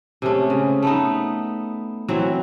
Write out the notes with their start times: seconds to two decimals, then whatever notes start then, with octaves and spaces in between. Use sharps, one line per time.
0.22 C3 G#3 A3 C#4
0.50 C#3
0.82 A3 B3 D#4
2.08 E3 F#3 C4 F#4